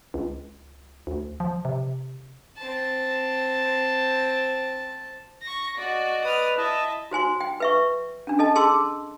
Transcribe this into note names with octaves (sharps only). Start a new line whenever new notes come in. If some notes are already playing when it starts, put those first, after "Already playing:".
C#2
D2
F3
C3
C4 A5
C#6 A#6
F#4 D5 D#5
B4 D#6 F6
E4 D#5 E5 A5
F#4 C5 G#5 C6
G5
B4 E5 C#6
C#4 D4
A4 D#5 A5
G#4 A5 C6 D6 E6